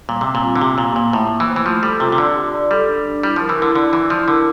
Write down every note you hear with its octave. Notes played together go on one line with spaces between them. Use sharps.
A#2 G3
C3 C4
A#2
F4
D3
C3 G4
A#2 A#3
A#2 A#3
A2 A3
A3
E3
C5
E3
F3 F4
G3 A4
C3 F4
C3
D3 D5
G4
D5
G3 A4
D4
D4
G3 E4
F3 A#4
E3
D3 E4
D3 D5
E3 E4
F3 E4
D3 A#4